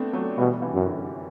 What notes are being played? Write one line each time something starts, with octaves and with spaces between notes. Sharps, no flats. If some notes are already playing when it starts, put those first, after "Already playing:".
Already playing: A3 B3 C4 D4
F#3 A3
B2 E3 G3
C3 E3
F#2
D3